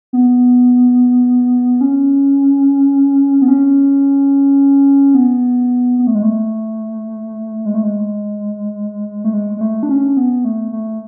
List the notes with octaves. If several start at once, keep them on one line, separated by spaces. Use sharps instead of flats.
B3
C#4
B3
C#4
B3
B3
A3
G#3
A3
G#3
A3
G#3
A3
G#3
G#3
A3
D4
C#4
B3
A3
A3